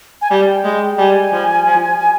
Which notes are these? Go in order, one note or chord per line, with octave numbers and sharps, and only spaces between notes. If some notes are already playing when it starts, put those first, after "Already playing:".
G#5
G3 G5
G#3
G3 G#5
F3
F3